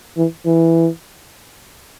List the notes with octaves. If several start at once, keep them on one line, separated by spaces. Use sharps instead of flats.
E3
E3